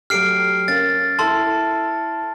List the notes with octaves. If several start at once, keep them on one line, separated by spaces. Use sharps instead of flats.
F#3 A3 G4 F6 C7 D7
A#3 C#4 A6
E4 A4 A5 C6 E6